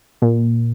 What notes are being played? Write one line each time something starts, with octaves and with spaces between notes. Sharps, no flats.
A#2